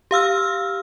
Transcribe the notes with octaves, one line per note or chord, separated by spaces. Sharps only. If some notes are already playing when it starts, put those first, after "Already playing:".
G4 F5 E6 F6